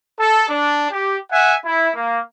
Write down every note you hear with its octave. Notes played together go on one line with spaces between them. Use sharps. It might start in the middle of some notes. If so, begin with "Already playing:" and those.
A4
D4
G4
E5 F#5 G#5
E4
A#3